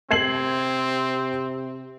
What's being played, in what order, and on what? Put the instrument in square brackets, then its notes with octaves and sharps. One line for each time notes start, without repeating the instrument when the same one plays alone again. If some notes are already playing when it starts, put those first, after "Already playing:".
[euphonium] C3 [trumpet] C4 [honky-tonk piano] G#6 C7 F#7